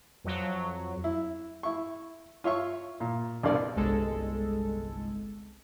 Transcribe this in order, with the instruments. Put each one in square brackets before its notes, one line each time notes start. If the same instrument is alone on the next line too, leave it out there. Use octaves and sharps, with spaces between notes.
[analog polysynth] F2 F#3
[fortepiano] E4
E4 C#6
F4 C#5 E5 C#6
A#2
C2 G2 B2 A#4 D5
[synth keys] G1 C2 G#3 A4